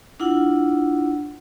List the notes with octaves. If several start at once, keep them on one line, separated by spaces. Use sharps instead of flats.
D4 E4 F4 F#5